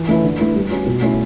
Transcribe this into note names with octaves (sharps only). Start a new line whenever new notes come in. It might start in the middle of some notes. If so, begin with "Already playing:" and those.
Already playing: E3
A3 C#4 E4 B4
D3
A3 E4 B4
G3
C#4 F#4
B2
A3 C#4 E4